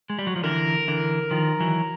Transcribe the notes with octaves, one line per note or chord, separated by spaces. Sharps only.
G#3
G3
F#3
F3
D3 E3 A#4
D3 E3
D#3 F3
E3 F#3